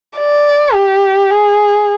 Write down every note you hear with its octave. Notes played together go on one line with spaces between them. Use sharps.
D5
G4
G#4